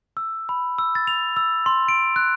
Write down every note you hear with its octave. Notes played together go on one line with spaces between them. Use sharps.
E6
B5
E6
A6
F7
E6
C6
D7
F#6